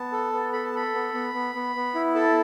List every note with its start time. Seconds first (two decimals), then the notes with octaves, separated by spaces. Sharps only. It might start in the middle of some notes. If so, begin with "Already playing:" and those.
Already playing: B3 A5
0.12 A4
0.33 B3
0.53 A4 B5
0.64 A5
0.74 A4 B5
0.94 B3
1.14 B3
1.34 B3
1.55 B3
1.76 B3
1.95 E4
2.15 A4 A5